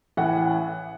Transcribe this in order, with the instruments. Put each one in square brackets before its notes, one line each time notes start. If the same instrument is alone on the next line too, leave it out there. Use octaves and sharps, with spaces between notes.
[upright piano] A1 A2 E3 F#5